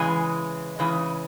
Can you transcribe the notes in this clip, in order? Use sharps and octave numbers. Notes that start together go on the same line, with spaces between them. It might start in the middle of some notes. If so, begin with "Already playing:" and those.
Already playing: C#3 E3 G#3 G#5
C#3 E3 G#3